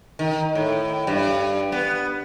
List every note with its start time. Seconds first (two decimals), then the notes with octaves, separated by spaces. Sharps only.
0.19 D#3
0.55 A2
1.07 G2
1.72 B3